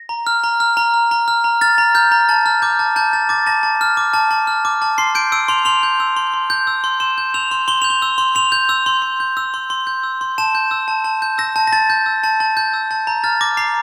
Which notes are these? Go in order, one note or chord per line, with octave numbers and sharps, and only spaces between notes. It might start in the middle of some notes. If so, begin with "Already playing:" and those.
Already playing: A#6
A#5
F6
A#5
F6
A#5
F6
A#5
F6
A#5
F6 A6
A#5
F6 G6
A#5
A5 A6
F6
D6 G6
A5
A5 G6
F6 A6
D6 A6
A5 A#6
A5
F6
D6
A5
A5
F6
D6
A5
C6 C7
G6 D7
E6 D7
C6 F7
C6 F7
G6
E6
C6
C6
G6
E6
C6
C6 E7
G6
E6 F7
C6
C6 G7
G6 F7
G7
E6
C6
C6 F7
G6
E6
C6
C6
G6
E6
C6
C6
G6
E6
C6
A5 E7
G6
E6
A5
A5
G6
E6 A#6
A5
A#6
A5 A6
G6
E6
A5
A5
G6
E6
A5
A#5 G6
F6 A6
D6 A#6
A#5 C7